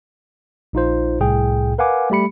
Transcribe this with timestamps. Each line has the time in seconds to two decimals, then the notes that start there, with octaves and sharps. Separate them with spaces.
0.73 A#1 D#4 F4 C5
1.20 C2 A2 G#4 G5
1.78 A#4 B4 F5 F#5 G#5 D6
2.10 G3 A3 G4 B5 C#7